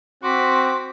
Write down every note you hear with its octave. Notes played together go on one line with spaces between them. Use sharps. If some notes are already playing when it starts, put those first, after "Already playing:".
C4 F#4 C6 D6 B6